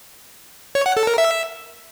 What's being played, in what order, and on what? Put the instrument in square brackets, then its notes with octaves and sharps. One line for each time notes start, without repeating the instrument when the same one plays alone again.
[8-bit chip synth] C#5
F#5
A4
A#4
E5